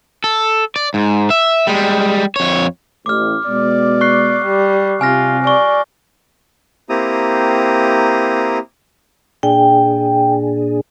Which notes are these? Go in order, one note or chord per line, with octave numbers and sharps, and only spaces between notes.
A4
D5
G#2
E5
G3 G#3
F2 C#5
A1 D6 F6
B2 G#3 D5
C#6 F#6 C7
G3
C3 F4 G#5 F6 A#6
D5 G#5 C#6
A#3 C4 E4 G4 A#5 D#6
A#2 D4 G#4 G5